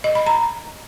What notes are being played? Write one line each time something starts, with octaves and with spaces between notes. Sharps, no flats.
D#5
B5
A#5